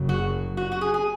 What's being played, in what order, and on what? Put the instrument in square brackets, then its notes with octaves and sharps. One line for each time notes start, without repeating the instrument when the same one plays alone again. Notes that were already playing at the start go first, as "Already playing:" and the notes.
Already playing: [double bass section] F#1 F#2 C#3 F#3
[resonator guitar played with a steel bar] F#4
F#4
F#4
G#4
G#4